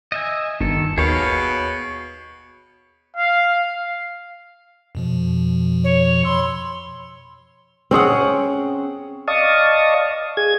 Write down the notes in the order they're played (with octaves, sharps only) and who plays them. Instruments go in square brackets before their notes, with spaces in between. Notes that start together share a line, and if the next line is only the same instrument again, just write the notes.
[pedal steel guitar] D#5 E5 G#5
[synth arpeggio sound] G1 [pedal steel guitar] D#3 A4
[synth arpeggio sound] D#2 [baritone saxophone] B2 [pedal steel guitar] G#4 C#5 F5
[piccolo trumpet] F5
[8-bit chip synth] F2 B2 F3
[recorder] C#5
[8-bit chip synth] B5 E6 [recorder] C6
[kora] C4 C#4 G#4 F#5
[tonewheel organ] D5 D#5 F5 A5 C#6 D#6
G#4 G#6